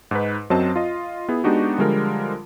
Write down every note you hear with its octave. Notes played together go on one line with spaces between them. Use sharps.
G#2 D#4 B4
F#2 F#3 C4 C5 D#5 A5
F4 D#5
B3 E4 G#4
G#3 B3 D4 D#4 F#4 G4
D3 F3 G3 G#3 F4 A#4